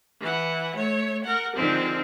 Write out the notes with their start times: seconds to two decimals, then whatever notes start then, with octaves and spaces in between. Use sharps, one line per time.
0.20 E3 F#5
0.75 A3 C#5
1.23 A#4 F#5
1.55 D3 D#3 F3 G#3 C4